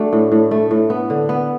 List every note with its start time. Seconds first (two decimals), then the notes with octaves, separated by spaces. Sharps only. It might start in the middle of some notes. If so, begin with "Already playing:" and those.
Already playing: A3 D4 F#4
0.13 A2
0.32 A2
0.51 A3
0.71 A2
0.90 B3
1.10 D3
1.29 B3